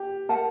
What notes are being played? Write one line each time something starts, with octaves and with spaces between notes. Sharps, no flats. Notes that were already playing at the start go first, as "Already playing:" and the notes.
Already playing: G4
A#4 F#5 A5